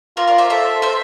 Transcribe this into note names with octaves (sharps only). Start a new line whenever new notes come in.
F4 A#4 D5
A#4 D5
C5 E5
A4 C5 E5
C5 E5